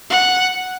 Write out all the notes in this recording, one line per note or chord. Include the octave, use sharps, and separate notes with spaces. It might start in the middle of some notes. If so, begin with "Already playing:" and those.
F#5